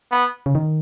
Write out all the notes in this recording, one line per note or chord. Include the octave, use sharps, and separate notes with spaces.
B3
C#3
D#3